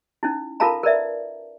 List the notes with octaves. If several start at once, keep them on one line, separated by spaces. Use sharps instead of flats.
C#4 D#4 E4
F4 A4 A#4 F5 A5 A#5
A#4 B4 D5 E5